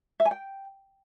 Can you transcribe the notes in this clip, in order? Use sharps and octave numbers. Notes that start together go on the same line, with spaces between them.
E5
G#5
G5